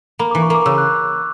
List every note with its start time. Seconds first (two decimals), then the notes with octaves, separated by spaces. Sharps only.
0.19 A#3 B5
0.31 E3 D6
0.42 C#6
0.50 A#3 D6
0.66 C#3 E6
0.78 F#6